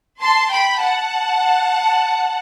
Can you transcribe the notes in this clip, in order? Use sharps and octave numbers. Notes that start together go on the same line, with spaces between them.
A5 C6
G5 B5
F#5 A5